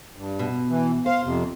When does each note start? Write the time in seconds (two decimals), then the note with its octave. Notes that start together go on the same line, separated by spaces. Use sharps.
0.17 G2
0.39 B2
0.69 E3
1.06 C5 F5
1.24 F2 C3